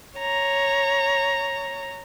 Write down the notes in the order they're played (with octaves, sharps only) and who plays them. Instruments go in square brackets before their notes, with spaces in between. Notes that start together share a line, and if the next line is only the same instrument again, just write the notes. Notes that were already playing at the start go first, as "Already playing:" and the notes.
[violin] C#5 A#5